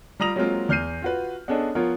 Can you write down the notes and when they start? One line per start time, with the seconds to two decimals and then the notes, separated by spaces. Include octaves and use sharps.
0.20 G3 F4 A#5 D#6 A#6 F7
0.36 F#3 G#3 A#3 C4 F4 A#4
0.69 E2 F6 G6 C7 D#7
1.02 F4 F#4 B4
1.48 B3 C#4 D4 G#4 A4 D#5
1.75 F3 B3 F4 A#4 C#5